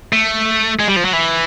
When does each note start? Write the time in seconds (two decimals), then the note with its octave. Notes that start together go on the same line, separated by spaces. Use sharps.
0.13 A3
0.79 G#3
0.88 G3
0.96 F3
1.05 F#3
1.13 E3